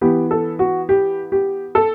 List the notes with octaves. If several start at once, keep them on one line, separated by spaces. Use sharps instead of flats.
E3 B3 G4
A4
F#4
G4
G4
A4